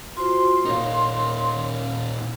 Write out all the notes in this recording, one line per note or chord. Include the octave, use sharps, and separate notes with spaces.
F4 F#4 C5 C6
A#2 D#4 A#4 C#5 F5